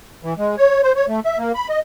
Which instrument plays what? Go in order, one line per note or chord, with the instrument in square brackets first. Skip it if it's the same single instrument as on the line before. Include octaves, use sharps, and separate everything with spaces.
[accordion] E3
G#3
C#5
C5
C#5
A3
E5
A#3
B5
D#5